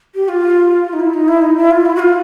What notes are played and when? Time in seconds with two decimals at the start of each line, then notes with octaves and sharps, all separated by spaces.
0.15 G4
0.28 F4
0.93 D#4
1.00 E4
1.14 D#4
1.28 E4
1.42 D#4
1.57 E4
1.71 F4
1.85 E4
1.96 F#4
1.99 F4